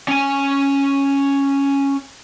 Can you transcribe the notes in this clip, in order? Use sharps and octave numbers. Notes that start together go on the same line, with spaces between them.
C#4 G#5